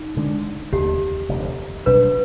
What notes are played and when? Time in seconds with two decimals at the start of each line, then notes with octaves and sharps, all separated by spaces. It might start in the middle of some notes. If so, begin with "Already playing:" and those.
Already playing: D#4
0.14 D2 D3 G#3 D4
0.72 F1 D#2 D3 G4
1.29 F1 D#2 D3
1.86 B1 B2 G3 D4 B4